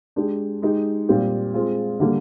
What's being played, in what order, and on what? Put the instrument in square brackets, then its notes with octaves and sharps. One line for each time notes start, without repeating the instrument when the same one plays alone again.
[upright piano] G#3 D4 G4
G#3 D#4 G4
A#2 G3 C4 G4
G#3 C4 F4 G#4
D3 G3 A#3 D4